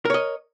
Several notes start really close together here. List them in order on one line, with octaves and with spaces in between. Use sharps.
A#4 C#5 D#5